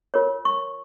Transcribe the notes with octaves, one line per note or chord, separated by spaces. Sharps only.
F4 A#4 C#5
C#6